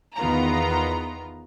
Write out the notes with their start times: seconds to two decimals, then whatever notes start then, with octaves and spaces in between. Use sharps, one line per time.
0.16 E2 D#3 B3 F4 A#5